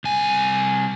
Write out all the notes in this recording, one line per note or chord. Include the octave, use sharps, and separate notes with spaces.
C2 G#5